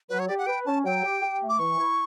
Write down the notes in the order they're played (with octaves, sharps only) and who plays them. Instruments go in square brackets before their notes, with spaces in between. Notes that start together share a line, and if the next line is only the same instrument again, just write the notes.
[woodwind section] F#3 [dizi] B4
[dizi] C#5
[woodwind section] G4 [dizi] D5
[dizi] F#5
[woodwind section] B4 [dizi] G5
[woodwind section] C#4 [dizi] A5
[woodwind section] F#3 [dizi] G5
[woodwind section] G4
G4
A3
[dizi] D6
[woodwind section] E3 [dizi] C#6
[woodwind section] E4